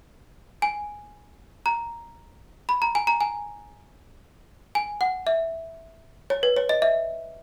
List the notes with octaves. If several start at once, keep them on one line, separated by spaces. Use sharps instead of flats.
G#5
A#5
B5
A#5
G#5
A#5
G#5
G#5
F#5
E5
C#5
B4
C#5
D#5
E5